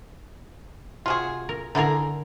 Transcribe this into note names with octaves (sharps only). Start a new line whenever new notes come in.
C3 F4 F#4 G#4
A#4
D3 D#4 E4 G#4 A#4